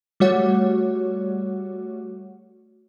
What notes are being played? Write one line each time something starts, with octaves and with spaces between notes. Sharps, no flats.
G3 A3 F#4 C#5 F#5